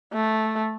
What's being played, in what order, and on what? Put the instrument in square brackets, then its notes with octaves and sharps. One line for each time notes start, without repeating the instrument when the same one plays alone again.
[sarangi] A3